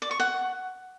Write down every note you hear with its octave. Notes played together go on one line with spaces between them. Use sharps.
D5
C#6
F#5